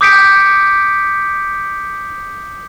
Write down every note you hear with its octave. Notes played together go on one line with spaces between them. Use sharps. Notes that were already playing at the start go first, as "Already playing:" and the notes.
D6 D#6 G6 B6 C#7 D7